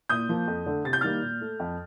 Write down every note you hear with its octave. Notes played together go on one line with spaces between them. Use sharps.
A#2 D#6 G6
F3 A#3
F2
D3 A3
C3 A6
G6
D#3 G3 A#3 F6 A6
A#2
A3
F2